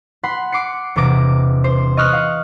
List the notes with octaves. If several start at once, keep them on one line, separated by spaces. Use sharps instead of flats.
F#5 B5 C6
D6 C7 C#7
E1 C3 D6 A#6
C5
D#5 C#6 F6 F#6
F5